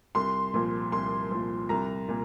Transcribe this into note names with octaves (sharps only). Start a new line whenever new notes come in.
C2 C6
A#2 F3
C2 C6
A#2 F3
C2 A#5
A#2